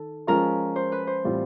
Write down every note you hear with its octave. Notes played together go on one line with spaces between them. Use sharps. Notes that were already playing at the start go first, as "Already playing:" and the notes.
Already playing: D#3 A4
F3 G#3 C#4 F4 A#4
C5
B4
C5
A2 E3 G3 C4 F4